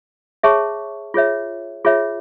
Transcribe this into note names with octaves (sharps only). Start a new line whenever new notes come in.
G#4 C#5 E5 A5 C#6
F4 G#4 C#5 E5
F4 G#4 C#5 E5